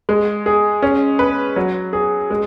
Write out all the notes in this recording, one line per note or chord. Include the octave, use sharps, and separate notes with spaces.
G#3
G#4
C#4
B4
F#3
G#4
G#3